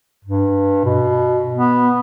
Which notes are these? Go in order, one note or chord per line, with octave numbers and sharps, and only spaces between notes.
G2
B2
B3